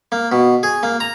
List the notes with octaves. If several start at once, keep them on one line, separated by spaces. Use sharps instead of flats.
A#3
B2
G#4
A#3
A#5